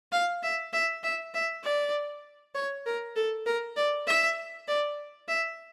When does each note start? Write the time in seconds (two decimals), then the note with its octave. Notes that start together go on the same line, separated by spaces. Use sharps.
0.12 F5
0.43 E5
0.73 E5
1.03 E5
1.34 E5
1.64 D5
2.55 C#5
2.86 A#4
3.16 A4
3.46 A#4
3.76 D5
4.07 E5
4.68 D5
5.28 E5